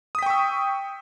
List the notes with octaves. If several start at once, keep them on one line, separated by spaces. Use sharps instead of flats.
G5 C#6 D#6 E6 B6